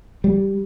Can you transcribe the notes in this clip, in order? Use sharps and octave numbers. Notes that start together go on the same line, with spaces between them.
G3